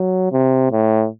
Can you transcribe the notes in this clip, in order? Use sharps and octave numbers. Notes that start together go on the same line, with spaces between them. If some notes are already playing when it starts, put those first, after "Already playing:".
Already playing: F#3
C3
A2